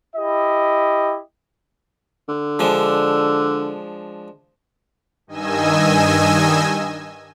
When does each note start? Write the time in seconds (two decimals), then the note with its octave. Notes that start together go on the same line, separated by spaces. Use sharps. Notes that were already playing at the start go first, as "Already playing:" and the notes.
0.15 E4 G4 D#5
2.28 D3
2.59 F3 G#3 D4
5.27 G2 D#3 D#5 G#5 E6